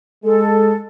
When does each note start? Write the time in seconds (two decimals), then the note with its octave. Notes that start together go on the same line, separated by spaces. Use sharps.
0.24 G#3 A4